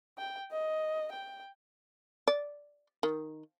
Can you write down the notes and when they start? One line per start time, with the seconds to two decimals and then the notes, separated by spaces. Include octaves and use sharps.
0.18 G5
0.52 D#5
1.12 G5
2.28 D5
3.03 D#3